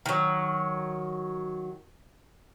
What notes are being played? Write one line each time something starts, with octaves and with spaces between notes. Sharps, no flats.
D#3 F#3